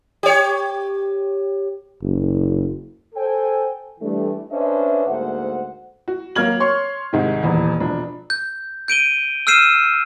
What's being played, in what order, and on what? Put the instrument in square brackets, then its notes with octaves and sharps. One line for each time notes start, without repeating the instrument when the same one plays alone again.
[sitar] G4 C#5
[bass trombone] F#1
[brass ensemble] A4 C5 G5 G#5
E3 G3 A3 D4
C#4 D4 B4 C5 D#5 E5
D2 G#2 A#3 C5 F#5
[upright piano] F#4
F#3 A#3 F6 G#6 F#7
C#5 C6 C#6
C2 G#2 D#3
D#1 E2
E1 F3 D4
[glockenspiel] G6
G6 D7 D#7 G7
E6 F6 G6 C7 D#7 E7